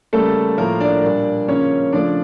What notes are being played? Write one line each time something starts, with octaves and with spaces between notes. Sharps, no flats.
C#3 G3 A3 A#3 A4
A2 F3 A3 A#3 A#4
D4 D5
A#2 G3 A#3
C#3 F3 A#3 C#4 C#5
C#3 F3 A3 D4 D5